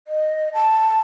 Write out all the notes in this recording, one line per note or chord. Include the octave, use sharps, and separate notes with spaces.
D#5
A5